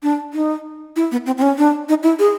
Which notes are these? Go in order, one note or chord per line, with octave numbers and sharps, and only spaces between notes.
D4
D#4
E4
B3
C4
C4
C#4
D4
D#4
E4
G#4